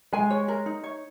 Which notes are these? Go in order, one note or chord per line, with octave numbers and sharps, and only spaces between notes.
G#3 G#5
C#5
A#4
D#4
C#5